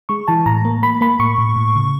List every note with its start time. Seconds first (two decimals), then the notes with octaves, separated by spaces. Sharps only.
0.09 G#3 C#6
0.28 E3 A5
0.46 A2 A#5
0.65 A#3
0.82 A#3 B5
1.01 A#3 B5
1.19 A2 C#6
1.38 A2
1.56 A2
1.76 C#3